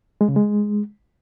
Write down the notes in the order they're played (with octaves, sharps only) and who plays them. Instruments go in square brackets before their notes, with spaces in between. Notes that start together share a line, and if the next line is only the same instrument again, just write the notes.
[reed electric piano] G#3
C#3
G#3